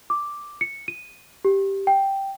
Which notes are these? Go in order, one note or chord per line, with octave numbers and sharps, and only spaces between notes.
D6
C#7
D#7
G4
G5